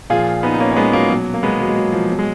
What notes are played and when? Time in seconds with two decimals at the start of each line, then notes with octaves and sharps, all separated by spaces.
0.10 A#2 F3 F4 G#4
0.43 B3 D#4
0.54 D#4
0.60 A#3 C#4
0.72 C#4
0.76 G#3 B3
0.93 F#3 A#3
1.10 B2 F#3
1.34 A#3
1.43 G#3 B3
1.60 F#3 A#3
1.69 G#3
1.76 F#3
1.92 F3
2.09 B2 F#3
2.19 G#3